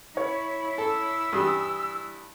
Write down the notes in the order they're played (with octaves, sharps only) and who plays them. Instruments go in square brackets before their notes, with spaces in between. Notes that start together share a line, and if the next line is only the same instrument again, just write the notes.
[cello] E4 [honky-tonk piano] C#5
[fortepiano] A4 [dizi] E6
[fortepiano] G2 E3 G3 [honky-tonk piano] D#6